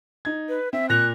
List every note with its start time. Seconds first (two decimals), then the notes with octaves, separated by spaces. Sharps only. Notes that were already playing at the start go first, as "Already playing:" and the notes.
0.25 D#4 G#6
0.49 B4
0.73 C4 E5
0.89 A#2 F#6 A#6 F7